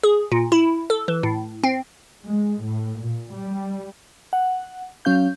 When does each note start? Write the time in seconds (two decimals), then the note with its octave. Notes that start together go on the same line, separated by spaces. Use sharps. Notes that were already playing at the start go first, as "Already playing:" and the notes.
0.03 G#4
0.32 A#2
0.52 E4
0.90 A4
1.08 E3
1.23 A2
1.64 C4
2.23 G#3
2.61 A2
3.01 A#2
3.32 G3
4.33 F#5
5.05 F#3 C#4 F5 G6